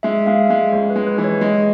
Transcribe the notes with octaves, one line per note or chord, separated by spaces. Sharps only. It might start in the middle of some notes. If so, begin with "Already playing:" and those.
G#3 E5
G#3 F5
E5
G#3 F5
C#2 C#5
B4
G#3
B4
E3
C#5
G#3 D#5